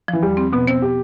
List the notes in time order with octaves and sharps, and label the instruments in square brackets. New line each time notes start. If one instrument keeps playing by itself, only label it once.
[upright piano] E3 [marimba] F3
[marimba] E2 [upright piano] G3
[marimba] C4
[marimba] B2 [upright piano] B3
[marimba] B3 [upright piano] C4
[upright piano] G4